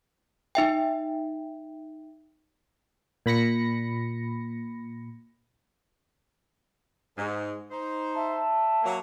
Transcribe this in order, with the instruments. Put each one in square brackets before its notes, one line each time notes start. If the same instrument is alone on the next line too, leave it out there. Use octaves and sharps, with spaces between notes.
[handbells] D#4 E5 G5
[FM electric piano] A#2 B5 A#6 C#7
[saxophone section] G#2
D#4 C5
[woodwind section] E5 A5
[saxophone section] F#3 A#3